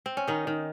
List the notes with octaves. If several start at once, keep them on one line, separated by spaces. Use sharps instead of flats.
C4
C#4
D#3 D#4
D#3